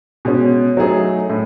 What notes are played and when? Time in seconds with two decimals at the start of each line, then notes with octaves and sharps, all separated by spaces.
0.25 B2 G#3 C#4
0.77 F#3 A3 D#4 G#4
1.29 A2